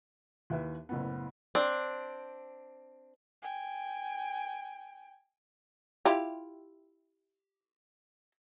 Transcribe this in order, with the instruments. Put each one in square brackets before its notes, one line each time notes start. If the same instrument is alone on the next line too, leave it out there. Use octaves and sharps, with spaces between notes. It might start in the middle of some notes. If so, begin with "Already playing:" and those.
[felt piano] D#2 E4 B4 E5
F#1 A2 B3
[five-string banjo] C4 D4
[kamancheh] G5 G#5
[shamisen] E4 F4 G4